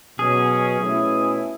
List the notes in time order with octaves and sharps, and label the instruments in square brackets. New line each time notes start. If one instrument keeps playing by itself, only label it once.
[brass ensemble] B2 F#3 C#4 [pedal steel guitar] G#4
[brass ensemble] B2 A3 C#4 E4